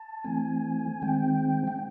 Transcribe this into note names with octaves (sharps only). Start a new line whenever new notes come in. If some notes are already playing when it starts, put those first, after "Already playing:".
Already playing: A5
E3 A3 C4 G#5
D#3 G#3 C4 G5
G5